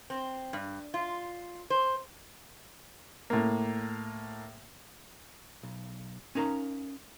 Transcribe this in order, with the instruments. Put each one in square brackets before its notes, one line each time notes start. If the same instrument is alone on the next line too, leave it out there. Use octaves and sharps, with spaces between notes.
[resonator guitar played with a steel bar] C4
G2
F4
C5
[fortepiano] A2 A#3
[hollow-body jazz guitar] B1
C#4 D#4 A#4 F5 A#5